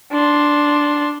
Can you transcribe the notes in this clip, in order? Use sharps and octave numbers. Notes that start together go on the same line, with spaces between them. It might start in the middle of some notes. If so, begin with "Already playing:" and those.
D4 C6